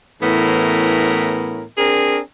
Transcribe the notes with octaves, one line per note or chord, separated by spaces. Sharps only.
A2 E3 B3 C#4 A#4
C4 D4 G#4 A#4